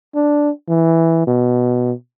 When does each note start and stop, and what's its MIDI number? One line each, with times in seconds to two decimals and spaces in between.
0.15 0.50 62
0.69 1.25 52
1.27 1.92 47